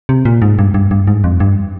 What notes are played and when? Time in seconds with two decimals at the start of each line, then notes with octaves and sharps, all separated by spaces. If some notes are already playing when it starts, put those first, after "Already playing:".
0.09 C3
0.25 A#2
0.42 G#2
0.59 G2
0.74 G2
0.91 G2
1.07 G#2
1.24 F2
1.40 G2